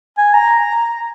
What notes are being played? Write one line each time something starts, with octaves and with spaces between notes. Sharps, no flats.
G#5
A#5